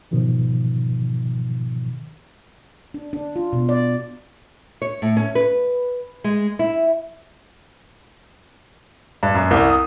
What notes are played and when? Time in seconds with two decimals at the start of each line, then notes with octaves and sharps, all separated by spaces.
0.11 G#2 B2 D#3 F3
2.94 D4
3.13 D4
3.36 F4
3.53 B2
3.69 D5
4.82 C#5
5.02 A2
5.17 C#4
5.35 B4
6.24 G#3
6.59 E4
9.23 G2
9.35 F#2
9.51 C2
9.70 D#6